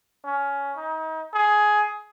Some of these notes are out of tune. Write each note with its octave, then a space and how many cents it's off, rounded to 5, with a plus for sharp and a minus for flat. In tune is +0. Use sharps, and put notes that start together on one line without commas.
C#4 +15
D#4 +35
G#4 +15